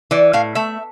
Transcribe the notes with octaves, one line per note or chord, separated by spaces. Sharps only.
E3 D5
A2 F5
A3 E5